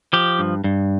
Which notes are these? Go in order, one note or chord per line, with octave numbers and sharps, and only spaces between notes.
F3 G4
G2
G2